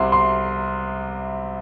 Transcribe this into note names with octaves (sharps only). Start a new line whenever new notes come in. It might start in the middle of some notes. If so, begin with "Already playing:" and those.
Already playing: C2 C3 C6
C6